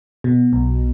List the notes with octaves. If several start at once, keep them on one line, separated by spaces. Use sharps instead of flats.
B2
B1